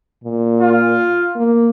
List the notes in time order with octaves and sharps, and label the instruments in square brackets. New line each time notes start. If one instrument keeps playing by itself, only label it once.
[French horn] A#2
[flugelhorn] F4
[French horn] A#3